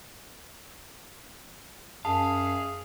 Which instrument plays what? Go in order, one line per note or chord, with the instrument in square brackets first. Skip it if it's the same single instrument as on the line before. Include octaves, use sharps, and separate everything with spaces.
[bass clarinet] F#2 [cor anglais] G#4 [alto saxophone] F5 [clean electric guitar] A5